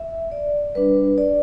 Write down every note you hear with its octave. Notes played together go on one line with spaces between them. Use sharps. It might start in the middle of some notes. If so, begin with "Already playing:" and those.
Already playing: E5
D5
G3 D4 B4
D5